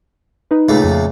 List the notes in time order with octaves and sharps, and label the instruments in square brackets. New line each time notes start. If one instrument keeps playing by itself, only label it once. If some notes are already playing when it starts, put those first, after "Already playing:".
[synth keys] D#4 B4
[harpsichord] C#2 A#2 A3
[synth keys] F2